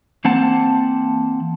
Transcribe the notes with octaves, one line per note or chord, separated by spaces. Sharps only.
E3 A#3 C4 F#5 A5